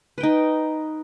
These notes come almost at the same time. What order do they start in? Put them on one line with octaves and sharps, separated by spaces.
B4 G5 D#4